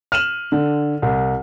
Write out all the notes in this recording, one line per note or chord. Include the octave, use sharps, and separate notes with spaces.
F6 D#7 E7 F#7
D3
C2